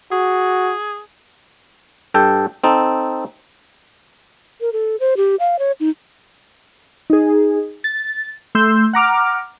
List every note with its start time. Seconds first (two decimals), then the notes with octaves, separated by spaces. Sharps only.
0.12 F#4 G#4
2.14 G2 A4 G5
2.64 C4 D#4 A4
4.61 A#4
4.73 A4
5.00 C5
5.17 G4
5.40 F5
5.59 C#5
5.80 D#4
7.10 D#4 G#4
7.84 A6
8.55 A3 C6 E6 G6
8.93 F#5 A#5 D6 F6